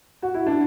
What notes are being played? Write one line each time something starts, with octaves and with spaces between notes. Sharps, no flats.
F#4
E4
D4